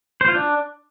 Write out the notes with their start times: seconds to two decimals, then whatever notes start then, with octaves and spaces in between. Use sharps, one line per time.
0.21 C5
0.28 F4
0.35 D4